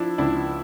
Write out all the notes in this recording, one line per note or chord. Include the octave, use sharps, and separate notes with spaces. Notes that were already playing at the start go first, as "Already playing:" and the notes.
Already playing: F3 D4 E4
C#2 D4 E4